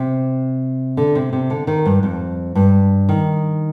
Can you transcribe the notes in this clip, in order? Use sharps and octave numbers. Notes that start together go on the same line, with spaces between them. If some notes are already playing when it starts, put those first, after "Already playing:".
Already playing: C3
D3
C3
C3
D3
D#3
G2
F2
G2
D#3